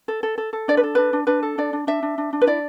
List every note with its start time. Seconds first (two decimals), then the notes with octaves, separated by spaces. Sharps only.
0.08 A4
0.23 A4
0.38 A4
0.53 A4
0.68 D4 D5
0.77 B4
0.83 A4
0.95 D4 B4
1.13 D4
1.27 D4 B4
1.43 A4
1.58 D4 D5
1.73 D4
1.87 D4 E5
2.03 D4
2.18 D4
2.33 D4
2.41 B4
2.47 E4 D5